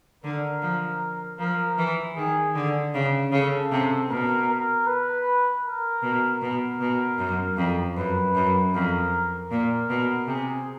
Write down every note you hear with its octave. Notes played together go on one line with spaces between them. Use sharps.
D3 A#4
F3
F3 A#4
E3
D#3 G#4
D3
C#3
C#3 A4
C3
B2 A#4
A#4
B4
A#4
B2
B2 A#4
B2
F#2
F2
F#2 B4
F#2
F2 A#4
A#2 A#4
B2
C3 G#4